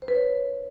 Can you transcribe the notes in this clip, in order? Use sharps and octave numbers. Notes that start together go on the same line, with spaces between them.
C5
B4
C#5